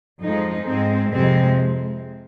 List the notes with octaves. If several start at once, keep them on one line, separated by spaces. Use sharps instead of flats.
F2 F3 G#3 D#4
G#2 G#3 C4
F2 C3 G#3 C4